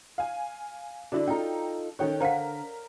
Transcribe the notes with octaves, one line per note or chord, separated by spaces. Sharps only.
F5 G#5
D3 D4 E4 F#4 D5
D#4 F4 A4 G5 A#5
D#3 C#4 A4 C#5 G5 F#6
D3 A#4 C5 F5 F#5 B6